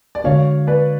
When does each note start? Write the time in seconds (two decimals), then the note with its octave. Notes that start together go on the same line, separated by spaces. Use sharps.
0.15 D5
0.24 D3 G#3 D4 F#4 C#5 F5
0.67 B4 D5